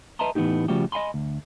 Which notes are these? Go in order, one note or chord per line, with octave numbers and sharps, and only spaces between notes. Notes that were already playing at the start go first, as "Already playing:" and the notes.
B4 D#5 E5 A5 A#5 C6
A2 E3 B3 C#4 D#4 G4
C#3 F3 G3 A3 F#4 G4
D#5 F5 G#5 B5 C6
D2